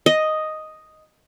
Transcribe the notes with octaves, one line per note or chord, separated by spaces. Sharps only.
D#5